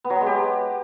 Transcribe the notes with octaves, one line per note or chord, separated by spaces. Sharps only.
B3
F#3
B3
G#3
G4